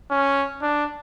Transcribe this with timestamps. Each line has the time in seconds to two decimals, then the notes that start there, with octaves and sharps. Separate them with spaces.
0.11 C#4
0.62 D4